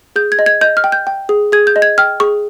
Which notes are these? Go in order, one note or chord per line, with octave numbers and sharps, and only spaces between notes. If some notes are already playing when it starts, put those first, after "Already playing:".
G#4 G6
G#6
D#5
G#6
D#5 G6
F6
G5
G6
G5
G#4
G#4 G#6
G6
D#5
G#6
G5 F6
G#4 C#6